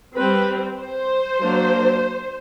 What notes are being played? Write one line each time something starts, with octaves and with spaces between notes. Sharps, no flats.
G3 C4 B4
C5
F#3 A#3 D4